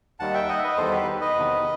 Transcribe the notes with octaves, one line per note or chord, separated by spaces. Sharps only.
D#2 D#3 G3 F#5 A5
E5 G5
D#5 F#5
E5
B4 D#5
E2 D#3 G3 A4 C5
G4 B4
B4 D#5
E2 C3 D#3